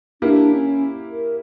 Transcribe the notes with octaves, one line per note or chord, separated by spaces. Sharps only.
A#3 D4 E4 G4
C#4
A#4